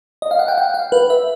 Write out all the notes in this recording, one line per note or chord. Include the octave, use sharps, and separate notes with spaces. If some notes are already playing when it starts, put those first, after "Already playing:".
D#5
F5
F#5
G5
F#5
F5
B4
E5